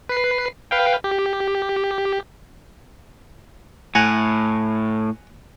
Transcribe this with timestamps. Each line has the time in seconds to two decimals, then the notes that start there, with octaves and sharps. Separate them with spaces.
0.09 B4 C7
0.71 B4 F5 G5
1.04 G4
3.95 A2 F#5 G#5 A#5